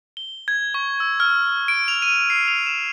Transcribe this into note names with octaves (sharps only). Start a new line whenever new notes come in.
G7
G#6
C#6
E6
F6
D7
F7
D#7
C7
F7
E7